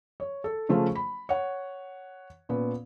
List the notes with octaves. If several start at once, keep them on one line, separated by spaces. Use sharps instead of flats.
C#5
A4
C#3 F3 A3 C#4 F4 C5
B5
C#5 F#5
A#2 B3 C#4